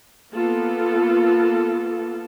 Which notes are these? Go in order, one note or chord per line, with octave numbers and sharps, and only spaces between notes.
A#3 B3 F4 A4